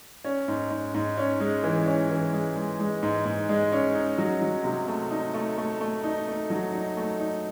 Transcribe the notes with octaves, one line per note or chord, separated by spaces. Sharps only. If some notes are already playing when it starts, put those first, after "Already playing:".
C#4
G#2
G#2
G#2
C#4
G#3
E3
C#4
E3
G#3
G#3
G#3
G#2
G#2
G#3
C#4
D#4
F#3
F#3
C3
A3
D#4
A3
A3
A3
D#4
A3
F#3
D#4
A3
D#4